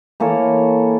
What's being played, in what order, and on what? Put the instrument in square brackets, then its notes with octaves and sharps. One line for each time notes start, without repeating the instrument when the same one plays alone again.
[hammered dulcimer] E3 A#3 A4 C#5